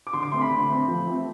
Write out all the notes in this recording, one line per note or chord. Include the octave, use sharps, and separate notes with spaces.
D6
D3 C6
D6
A3 C4 C6
B5
D3
A3 C4
F3
A3 C4